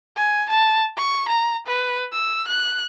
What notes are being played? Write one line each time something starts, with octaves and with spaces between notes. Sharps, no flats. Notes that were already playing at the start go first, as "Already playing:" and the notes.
G#5
A5
C#6
A#5
B4
E6
F#6